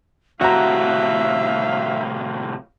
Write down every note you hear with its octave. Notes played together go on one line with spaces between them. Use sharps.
A2 C3 F#3 F#4 E5 F5 A#5